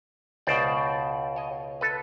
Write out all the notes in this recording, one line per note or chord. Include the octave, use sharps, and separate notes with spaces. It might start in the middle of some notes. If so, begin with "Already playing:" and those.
C#2 B2 C5 D5
C#5 D#5
A4 B4